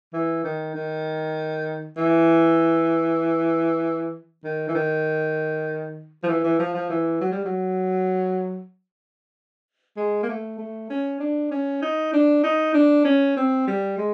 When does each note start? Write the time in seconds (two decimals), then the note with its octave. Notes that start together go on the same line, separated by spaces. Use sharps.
0.13 E3
0.44 D#3
0.75 D#3
1.97 E3
4.44 D#3
4.69 E3
4.75 D#3
6.24 F3
6.28 E3
6.44 E3
6.60 F3
6.74 F3
6.90 E3
7.21 F#3
7.32 G3
7.45 F#3
9.97 G#3
10.23 A#3
10.29 A3
10.59 A3
10.90 C#4
11.20 D4
11.51 C#4
11.82 D#4
12.13 D4
12.44 D#4
12.74 D4
13.05 C#4
13.37 C4
13.67 G3
13.98 G#3